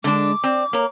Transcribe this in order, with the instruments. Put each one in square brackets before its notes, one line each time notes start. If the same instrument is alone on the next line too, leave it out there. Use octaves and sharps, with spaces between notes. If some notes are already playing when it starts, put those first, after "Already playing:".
[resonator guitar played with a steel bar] D3 D4 [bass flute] G#3 [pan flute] D6
[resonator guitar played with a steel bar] C4 [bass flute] D5
[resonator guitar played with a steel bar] A#3 A#4 [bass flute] C#5